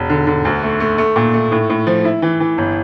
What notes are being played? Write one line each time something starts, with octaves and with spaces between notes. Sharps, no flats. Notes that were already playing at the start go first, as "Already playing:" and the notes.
Already playing: E1
D3
D3
D2
A3
A3
A3
A#2
A3
A2
A2
F3
E4
E3
E3
G1